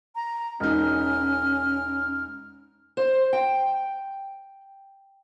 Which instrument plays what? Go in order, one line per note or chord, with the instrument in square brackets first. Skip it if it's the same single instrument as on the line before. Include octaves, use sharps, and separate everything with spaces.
[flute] A#5
[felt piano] E1 D#4 [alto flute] C#4 [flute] F6
[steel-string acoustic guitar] C5
G5